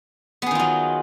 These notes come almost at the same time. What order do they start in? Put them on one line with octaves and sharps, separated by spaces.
B3 G#4 D#3 F4 F#3